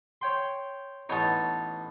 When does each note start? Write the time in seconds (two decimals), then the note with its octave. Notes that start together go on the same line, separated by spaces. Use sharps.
0.21 C#5 G5 C6
1.09 A1 B3 D#4 C#5 A5